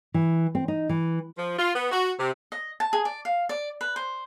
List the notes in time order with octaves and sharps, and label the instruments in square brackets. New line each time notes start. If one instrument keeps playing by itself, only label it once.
[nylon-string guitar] E3
C4
D#4
E3
[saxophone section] F3
F4
B3
F#4
C3
[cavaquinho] D#5
A5
G#4
D5
F5
D5
B4
C5